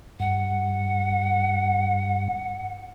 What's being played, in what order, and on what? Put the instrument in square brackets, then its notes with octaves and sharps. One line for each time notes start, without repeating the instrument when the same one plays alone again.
[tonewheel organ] G2 [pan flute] F#5